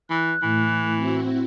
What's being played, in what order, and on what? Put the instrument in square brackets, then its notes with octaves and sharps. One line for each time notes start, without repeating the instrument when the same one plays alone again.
[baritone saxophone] E3 [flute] F#6
[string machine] A2 [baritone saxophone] E3
[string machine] C4 E4 F#4